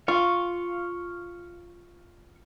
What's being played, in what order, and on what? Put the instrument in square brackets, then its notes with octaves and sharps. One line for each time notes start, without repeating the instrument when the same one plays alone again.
[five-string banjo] F4 [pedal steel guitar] F5 C#6